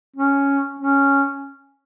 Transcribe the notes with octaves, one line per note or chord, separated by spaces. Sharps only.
C#4
C#4